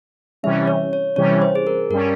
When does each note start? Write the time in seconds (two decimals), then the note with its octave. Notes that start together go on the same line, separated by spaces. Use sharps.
0.43 C3 E3 G3 C#4 E5
0.67 C#5
0.93 C#5
1.16 C3 E3 G3 C#4 C#5
1.42 C5
1.55 G#4
1.67 A#4
1.90 G2 G3 C#4 A#4